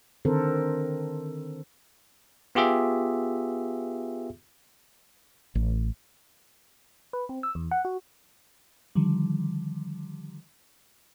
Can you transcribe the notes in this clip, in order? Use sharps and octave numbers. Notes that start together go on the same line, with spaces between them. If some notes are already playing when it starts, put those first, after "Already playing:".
D3 D#3 C4 A4 A#4 C5
B3 F4 G4 G#4 E5
A1
B4
C4
E6
E2
F#5
F#4
D3 D#3 F3 G3